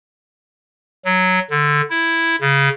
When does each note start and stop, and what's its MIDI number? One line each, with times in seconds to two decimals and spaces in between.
1.05 1.39 54
1.50 1.81 50
1.90 2.36 64
2.41 2.69 49